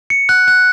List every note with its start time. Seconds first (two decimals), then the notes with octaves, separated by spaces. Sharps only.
0.10 C#7
0.29 F#6
0.48 F#6